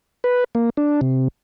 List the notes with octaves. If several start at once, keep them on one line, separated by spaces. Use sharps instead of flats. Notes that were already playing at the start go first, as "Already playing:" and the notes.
B4
A#3
D4
C3